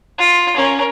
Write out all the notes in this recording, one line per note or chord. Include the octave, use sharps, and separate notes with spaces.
F4
C#4 A#4